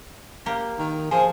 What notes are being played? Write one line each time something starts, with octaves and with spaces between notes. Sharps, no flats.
A#3 G4
D#3
F3 G#4